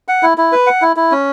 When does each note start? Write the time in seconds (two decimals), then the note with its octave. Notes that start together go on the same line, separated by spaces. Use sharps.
0.08 F#5
0.23 E4
0.38 E4
0.52 B4
0.67 F#5
0.82 E4
0.96 E4
1.11 C#4